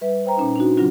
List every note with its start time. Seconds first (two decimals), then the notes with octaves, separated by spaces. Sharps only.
0.01 G3 B4 E5
0.25 C5 G5 A#5
0.37 A#2 C#4 D#4
0.56 D4 D#4 F#4
0.77 C#3 F#3 C#4 D4 F4 F#4